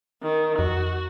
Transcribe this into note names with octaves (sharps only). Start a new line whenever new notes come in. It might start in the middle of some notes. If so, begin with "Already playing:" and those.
D#3
F2 F#4